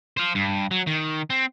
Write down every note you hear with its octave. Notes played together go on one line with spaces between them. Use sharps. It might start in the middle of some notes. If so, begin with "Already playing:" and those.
C5 F5
G2
F#3
D#3
C4